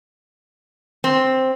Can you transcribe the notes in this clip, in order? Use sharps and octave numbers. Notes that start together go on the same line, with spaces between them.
C4